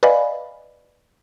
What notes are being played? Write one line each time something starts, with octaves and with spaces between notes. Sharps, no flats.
B4 D5 D#5 F5 G#5 B5